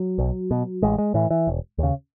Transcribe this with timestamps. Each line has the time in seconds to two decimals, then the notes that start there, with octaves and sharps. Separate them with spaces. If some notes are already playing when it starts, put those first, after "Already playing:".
Already playing: F#3
0.18 B1
0.51 B2
0.82 A1 G#3
0.98 G#3
1.14 A2 E3
1.30 E3
1.47 E1
1.78 D#2 C#3